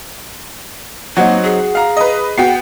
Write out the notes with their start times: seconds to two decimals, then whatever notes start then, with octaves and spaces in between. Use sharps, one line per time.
1.17 F#3 A#3 C4 D#4 F#4
1.43 G#4
1.75 F5 A#5
1.97 B4 D#5
2.38 B3 F#4 G5 C7